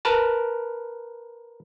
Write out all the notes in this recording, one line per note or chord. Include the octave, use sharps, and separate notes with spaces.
A#4 B4 A5